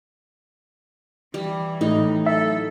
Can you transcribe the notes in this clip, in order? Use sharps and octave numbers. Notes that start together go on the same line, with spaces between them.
E3 G3
A2 D#4
F#3 A4 E5